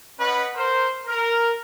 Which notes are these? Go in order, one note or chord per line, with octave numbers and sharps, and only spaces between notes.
C#4 B4 D#5 F#5 B5
A#4 C5
A#4